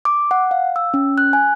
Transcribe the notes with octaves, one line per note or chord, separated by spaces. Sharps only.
D6
F#5
F5
E6
C#4
F#6
G#5